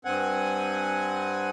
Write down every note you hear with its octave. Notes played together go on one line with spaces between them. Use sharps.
G2 C4 F#5 G#5